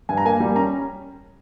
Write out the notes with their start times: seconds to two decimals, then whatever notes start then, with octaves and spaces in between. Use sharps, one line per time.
0.09 G2 G#5
0.17 A#5
0.25 A#3 G#5
0.40 G3
0.56 C#4 A#5